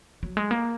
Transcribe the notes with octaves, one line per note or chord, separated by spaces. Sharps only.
F#3
G#3
A#3